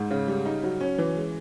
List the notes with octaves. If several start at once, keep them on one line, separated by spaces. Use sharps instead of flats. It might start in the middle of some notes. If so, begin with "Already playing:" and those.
Already playing: G#2
C#3
G3
D#4
F#3
C#4
E3
G#3